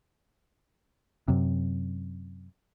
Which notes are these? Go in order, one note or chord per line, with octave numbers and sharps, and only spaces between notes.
F#2 C3